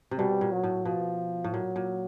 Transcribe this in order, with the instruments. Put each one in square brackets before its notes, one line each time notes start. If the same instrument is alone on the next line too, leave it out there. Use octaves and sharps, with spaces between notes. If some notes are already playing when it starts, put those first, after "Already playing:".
[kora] C3
[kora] B2 [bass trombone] G3
[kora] A#2
[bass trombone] F#3
[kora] A2
[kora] B2 [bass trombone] F3
[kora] A2
[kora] A#2 [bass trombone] F#3
[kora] A#2